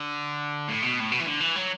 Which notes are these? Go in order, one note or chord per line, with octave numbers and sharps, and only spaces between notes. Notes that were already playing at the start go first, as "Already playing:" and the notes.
Already playing: D3
A2
B2
A2
B2
E3
D3
E3
F#3